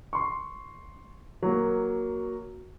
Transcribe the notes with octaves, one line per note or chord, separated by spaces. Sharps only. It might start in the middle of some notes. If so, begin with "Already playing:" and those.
C6 C#6
F#3 A#3